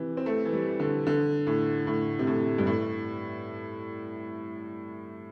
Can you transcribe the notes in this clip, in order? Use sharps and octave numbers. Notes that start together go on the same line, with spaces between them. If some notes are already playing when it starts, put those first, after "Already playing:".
Already playing: C3 E3
C4
A3
E3
G3
D3
D3
A2
A2
C3
A2
G2
A2